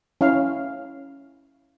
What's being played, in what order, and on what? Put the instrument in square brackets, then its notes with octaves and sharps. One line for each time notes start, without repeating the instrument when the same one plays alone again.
[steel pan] C#4 E4 F5